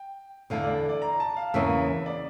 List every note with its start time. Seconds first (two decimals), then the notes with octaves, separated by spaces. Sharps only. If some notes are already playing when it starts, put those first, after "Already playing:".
Already playing: G5
0.50 E2 D3 A3 E4 F5
0.63 D5
0.89 D5
1.02 A#5
1.20 A5
1.36 F5
1.54 E2 C#3 E3 A#3 C#4 E5
2.06 D5